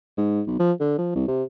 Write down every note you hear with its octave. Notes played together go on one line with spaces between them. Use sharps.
G#2
B1
F3
D3
F3
C2
C3